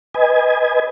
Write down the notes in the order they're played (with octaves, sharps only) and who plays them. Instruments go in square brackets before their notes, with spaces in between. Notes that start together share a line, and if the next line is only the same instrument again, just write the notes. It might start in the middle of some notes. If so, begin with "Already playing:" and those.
[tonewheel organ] B4 D#5 G#5